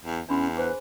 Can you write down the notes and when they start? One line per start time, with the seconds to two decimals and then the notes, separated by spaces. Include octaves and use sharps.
0.05 E2
0.29 E2 C#4 D4 B5 C6
0.57 G#4 B4 C5 G#5